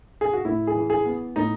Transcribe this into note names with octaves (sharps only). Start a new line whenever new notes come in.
G#4
F#4
A2 E4
G#4
E3
G#4
B3
A2 D#4